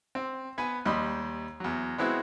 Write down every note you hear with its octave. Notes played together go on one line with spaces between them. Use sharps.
C4
B3 B4 G#5
D#2 G3 D#5 B5 C6
E2 F#3
G#3 B3 C4 E4 F#4